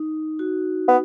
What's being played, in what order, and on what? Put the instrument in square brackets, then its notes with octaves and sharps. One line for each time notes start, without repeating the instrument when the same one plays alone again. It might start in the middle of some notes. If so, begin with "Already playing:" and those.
Already playing: [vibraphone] D#4
F#4
[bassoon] B3